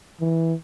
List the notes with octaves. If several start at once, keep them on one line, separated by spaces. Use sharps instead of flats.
E3